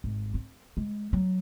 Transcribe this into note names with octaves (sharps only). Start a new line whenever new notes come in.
G#1
C4
G#3
F#3